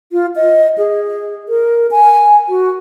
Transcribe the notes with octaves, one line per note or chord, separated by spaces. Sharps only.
F4
D#5
G#4
A#4
G#5
F#4